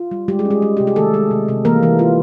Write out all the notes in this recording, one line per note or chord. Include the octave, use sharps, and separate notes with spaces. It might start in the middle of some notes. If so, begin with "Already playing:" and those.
Already playing: F4
G3
G3 G#3 G4
G#3 G#4
C#4
G#3 G#4
G3
C3 G4
G#4
D#3 A3 A4
G#3
C3
C3
E3 A#3 A#4
E3
F4